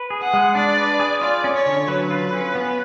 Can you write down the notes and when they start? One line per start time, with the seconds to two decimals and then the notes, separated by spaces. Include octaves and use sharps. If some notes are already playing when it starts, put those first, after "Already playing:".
Already playing: B4
0.10 G#4
0.22 F#5
0.33 G#3
0.55 D4 D5
0.77 B4
0.99 G#4
1.21 F4 D5
1.44 C#4
1.55 C#5
1.66 D3
1.87 F#3 B4
2.11 F4
2.33 C#4
2.55 B3